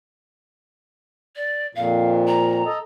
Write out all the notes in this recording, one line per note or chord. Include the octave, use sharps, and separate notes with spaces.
D5
F2 A#2 F5
A#5
A4 D#5